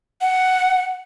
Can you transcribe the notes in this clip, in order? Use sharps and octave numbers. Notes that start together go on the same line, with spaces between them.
F#5